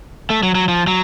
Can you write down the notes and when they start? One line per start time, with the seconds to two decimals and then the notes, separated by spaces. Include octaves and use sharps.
0.30 A3
0.43 F#3
0.55 F#3
0.69 F3
0.87 F#3